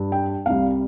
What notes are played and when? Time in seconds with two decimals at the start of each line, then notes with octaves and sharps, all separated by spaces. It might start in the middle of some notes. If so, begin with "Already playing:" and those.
Already playing: G2 G3
0.12 G5
0.46 C2 C3 G3 F5